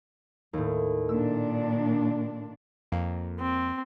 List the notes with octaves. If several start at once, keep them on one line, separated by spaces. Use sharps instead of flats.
D#2 A2
A#2 D#3 D4 E6
F2 A#3
C4